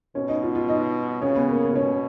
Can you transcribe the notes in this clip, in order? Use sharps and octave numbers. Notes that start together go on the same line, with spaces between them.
B2 C#4
D#4
F4
F4
D#4
C#3 C#4
B3
A#3
B3
B2 C#4